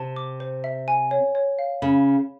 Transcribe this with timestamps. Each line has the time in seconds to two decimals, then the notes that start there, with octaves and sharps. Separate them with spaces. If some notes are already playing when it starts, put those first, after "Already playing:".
Already playing: C3 A5
0.16 D6
0.40 C5
0.64 E5
0.88 G#5
1.11 C#5
1.35 C#5
1.59 F5
1.82 C#3 B5